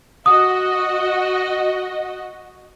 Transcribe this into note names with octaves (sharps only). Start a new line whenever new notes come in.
F#4 D#5 D#6